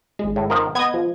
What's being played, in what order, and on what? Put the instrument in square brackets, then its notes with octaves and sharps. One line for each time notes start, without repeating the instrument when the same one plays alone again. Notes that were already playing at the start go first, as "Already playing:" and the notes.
[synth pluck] G#1 G#3
[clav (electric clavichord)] A2
D#3 F3 A#4
[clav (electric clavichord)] B3 [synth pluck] D#5 G#6
[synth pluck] F3